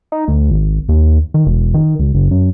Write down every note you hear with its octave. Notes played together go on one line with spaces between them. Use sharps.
D#4
D2
G#1
D#2
D#3
E1
D#3
C#2
F#1
F#2